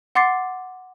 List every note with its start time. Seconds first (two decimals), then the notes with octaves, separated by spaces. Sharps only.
0.15 F#5 C6 D6 A6 C7